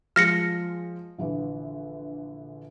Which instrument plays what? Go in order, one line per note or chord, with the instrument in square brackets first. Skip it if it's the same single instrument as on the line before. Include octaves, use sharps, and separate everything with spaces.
[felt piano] F3 G#3 [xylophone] F6 A#6 C#7
[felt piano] A#1 D3 E3